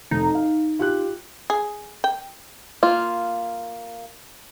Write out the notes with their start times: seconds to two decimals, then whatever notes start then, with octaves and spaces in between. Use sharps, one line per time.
0.11 F1 D#4
0.35 F5
0.79 F4 G4 F#6
1.50 G#4
2.04 G5
2.83 A#3 F4